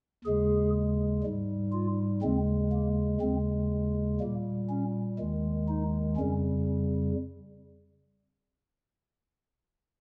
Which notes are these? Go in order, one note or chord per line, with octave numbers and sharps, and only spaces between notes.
D#2 C#3 G#3 G#4
G#2 G3
F4
D#2 C#3 G#3 C4
A#3
D#2 C#3 G#3 C4
A#2 G3 A#3
C#4
D#2 D#3 G#3
D#4
F2 C#3 G3 C#4